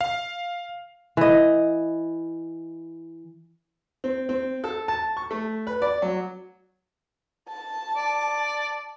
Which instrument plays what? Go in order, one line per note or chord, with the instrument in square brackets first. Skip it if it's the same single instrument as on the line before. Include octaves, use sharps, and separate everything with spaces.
[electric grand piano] F5
[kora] E3 D#5
[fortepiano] C4
C4
A4
A5
C#6
A3
B4
D5
F#3
[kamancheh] A5
[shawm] D5